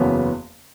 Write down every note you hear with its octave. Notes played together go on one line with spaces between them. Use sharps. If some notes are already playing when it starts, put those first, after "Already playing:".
Already playing: F#1 E2 C#3 F#3 B3